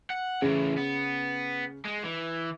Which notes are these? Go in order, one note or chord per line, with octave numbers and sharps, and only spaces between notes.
F#5
A2 C#3 E3
B3
G#3
E3